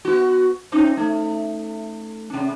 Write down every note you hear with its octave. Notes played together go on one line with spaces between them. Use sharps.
B3 F#4
C4 C#4 D#4
A3
C3 C#4